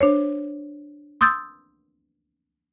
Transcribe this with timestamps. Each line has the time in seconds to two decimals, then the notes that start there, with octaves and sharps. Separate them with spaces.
0.01 D4 C5 C#5
1.21 C6 D#6 E6 G6 A6